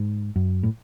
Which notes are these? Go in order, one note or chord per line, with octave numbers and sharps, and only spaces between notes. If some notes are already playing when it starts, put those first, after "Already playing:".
Already playing: G#2
F#2
A2